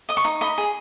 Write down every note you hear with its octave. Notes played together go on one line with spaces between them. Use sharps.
D#5 D#6
C#6
D#4
D#5 B5
G#4